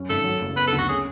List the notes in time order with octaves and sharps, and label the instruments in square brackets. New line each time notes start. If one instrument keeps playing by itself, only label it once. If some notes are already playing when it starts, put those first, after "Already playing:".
Already playing: [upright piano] F#2 C#4
[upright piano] G#1 [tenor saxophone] A4
[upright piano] F#3
F#1
[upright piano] B3 [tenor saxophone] B4
[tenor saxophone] A4
[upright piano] D2
[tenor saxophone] F#4
[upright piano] C#4 [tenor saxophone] G#4